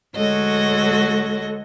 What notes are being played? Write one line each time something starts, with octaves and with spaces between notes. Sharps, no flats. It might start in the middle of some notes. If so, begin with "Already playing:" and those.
D2 G#3 F#4 A4 C#5 D#5